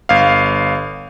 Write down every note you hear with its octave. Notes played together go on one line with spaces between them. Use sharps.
G1 F5